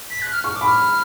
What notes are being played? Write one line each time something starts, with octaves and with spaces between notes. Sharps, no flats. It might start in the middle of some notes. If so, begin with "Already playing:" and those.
B6
F#6
F6
C#6 F6
D6
B5
F6